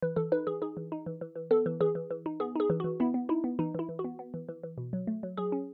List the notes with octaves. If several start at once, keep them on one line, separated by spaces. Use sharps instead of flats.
E3 B4
E3 A4
D#4 B4
E3 G#4
D#4 G#4
E3
D#4
E3
E3
E3
B3 A4
E3
E3 G#4
E3
E3
D#4
B3 G#4
D#4 G#4
E3
E3 F#4
B3 E4
B3
D#4 E4
B3
E3 D#4
E3 E4
E3
F#4
B3
B3
E3
E3
E3
B2
F#3
A3
F#3
F#3 G#4
C#4